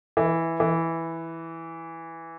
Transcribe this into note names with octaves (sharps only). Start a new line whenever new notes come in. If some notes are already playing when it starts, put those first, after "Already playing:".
E3
E3